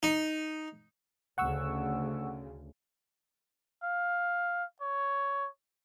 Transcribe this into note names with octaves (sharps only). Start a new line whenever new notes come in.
D#4
D2 C#3 F#5 C#6 E6
F5
C#5